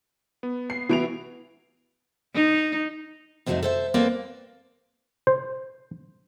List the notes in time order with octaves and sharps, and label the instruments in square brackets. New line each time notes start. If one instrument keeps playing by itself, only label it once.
[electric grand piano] B3
[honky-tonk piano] C7
[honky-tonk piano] E3 D7 F7 [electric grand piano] B3 E4 F#4
[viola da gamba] D#4
[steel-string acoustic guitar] F2 C3 F#3 G3 A3 D#4
A4 C5 E5
A#3 C4 A4 B4 D5
[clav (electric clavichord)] C5